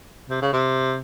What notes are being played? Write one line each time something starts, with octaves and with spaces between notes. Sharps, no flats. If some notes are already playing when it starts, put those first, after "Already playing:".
C3
C#3
C3